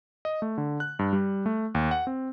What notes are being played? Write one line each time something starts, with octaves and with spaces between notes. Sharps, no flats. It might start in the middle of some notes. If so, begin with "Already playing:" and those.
D#5
A3
D3
F#6
G2
G3
A3
D#2
F#5
C4